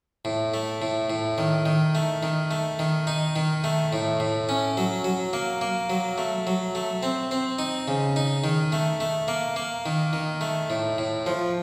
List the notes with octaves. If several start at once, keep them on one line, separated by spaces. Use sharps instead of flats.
A2
A3
A2
A2
D#3
D#3
A3
D#3
A3
D#3
D#4
D#3
A3
A2
A2
C#4
F#3
F#3
A#3
A#3
F#3
A3
F#3
A3
C4
C4
D#4
C#3
D#4
D#3
A3
A3
A#3
A#3
D#3
D#3
A3
A2
A2
F3